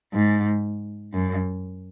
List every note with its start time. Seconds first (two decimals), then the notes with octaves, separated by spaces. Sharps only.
0.13 G#2
1.13 F#2